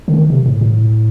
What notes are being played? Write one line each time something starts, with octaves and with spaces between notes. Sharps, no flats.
D3
D#3
C3
A2
A2